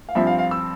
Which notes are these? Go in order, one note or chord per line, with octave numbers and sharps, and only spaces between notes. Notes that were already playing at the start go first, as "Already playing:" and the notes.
F5
G2 F3 C4 E5
F5
F5
E6